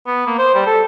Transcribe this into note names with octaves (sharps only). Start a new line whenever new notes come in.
B3
A#3
C5
G3
A4